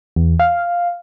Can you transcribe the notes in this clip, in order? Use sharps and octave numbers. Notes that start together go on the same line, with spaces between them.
E2
F5